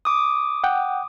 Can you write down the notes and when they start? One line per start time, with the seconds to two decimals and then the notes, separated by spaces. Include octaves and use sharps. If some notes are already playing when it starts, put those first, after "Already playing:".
0.05 D6 D#6
0.64 F#5 G5